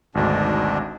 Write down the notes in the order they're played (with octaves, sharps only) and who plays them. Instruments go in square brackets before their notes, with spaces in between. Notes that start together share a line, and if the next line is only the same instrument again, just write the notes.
[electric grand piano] G#1 D2 G#2 [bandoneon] B2 D4